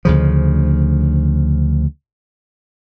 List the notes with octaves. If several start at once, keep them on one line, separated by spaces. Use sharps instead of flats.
D2 C#3 F3